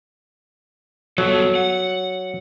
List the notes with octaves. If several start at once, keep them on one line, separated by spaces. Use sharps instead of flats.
F#3 G3 B3 A4
F#5